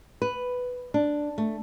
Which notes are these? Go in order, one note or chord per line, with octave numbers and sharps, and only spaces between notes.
B4
D4
A3